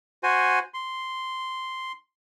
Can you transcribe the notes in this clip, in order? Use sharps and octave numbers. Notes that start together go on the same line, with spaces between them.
F#4 C5 G#5
C6